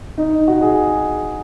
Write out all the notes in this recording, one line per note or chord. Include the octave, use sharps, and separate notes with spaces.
D#4
F#4
G#4